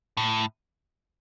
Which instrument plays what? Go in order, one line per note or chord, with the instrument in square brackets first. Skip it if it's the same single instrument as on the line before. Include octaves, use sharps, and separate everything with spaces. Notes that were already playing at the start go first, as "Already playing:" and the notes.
[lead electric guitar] A2